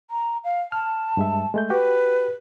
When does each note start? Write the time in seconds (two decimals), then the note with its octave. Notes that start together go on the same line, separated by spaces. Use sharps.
0.11 A#5
0.44 F5
0.72 A5 F6
1.17 G2 G#3 E5
1.54 G#3 A3 G6
1.70 F#4 G4 B4